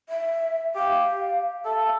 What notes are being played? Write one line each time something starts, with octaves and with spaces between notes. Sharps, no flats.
E5
G4 F5
A4 E5
F5
E5